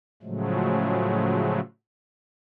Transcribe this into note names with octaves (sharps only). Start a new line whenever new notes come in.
A2 C#3 F3 F#3 G#3 A3